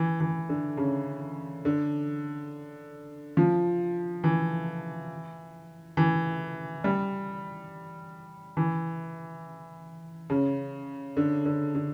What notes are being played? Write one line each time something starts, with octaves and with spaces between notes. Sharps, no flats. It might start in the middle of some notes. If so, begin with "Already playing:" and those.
Already playing: E3
E3
D3
C#3
D3
F3
E3
E3
G3
E3
C#3
D3
D3
D3